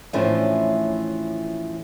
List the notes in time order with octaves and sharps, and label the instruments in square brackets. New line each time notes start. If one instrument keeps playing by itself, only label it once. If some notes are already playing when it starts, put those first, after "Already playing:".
[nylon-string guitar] A2 E3 F3 A3 C#4 D4